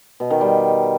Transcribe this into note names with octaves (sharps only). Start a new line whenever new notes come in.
B2
D#3
G3